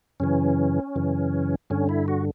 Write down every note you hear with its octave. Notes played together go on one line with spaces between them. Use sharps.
F#2 C#3 E3 C#4
F#2 C#3 E3
G2 D3 C#4
E4
F#4